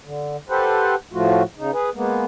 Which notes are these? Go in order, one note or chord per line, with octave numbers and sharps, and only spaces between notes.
D3
G4 A4 B4 C5 F#5
A2 F3 A3 F4 F#4
C#3 D#4
G#4 B4
G#3 A#3 B3